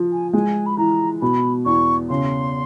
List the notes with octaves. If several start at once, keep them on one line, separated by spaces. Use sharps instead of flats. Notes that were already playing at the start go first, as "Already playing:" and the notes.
Already playing: F3
G#5
G#3 G#5
B5
E3 A#5
B2 B5
E2 C#6
C#3 C6